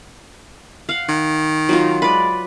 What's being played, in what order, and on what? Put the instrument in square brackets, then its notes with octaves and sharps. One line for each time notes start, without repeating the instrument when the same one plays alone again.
[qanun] F5 F#5
[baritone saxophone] D#3
[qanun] F#3 D#4 F4
[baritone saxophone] G#3 [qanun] B4 D5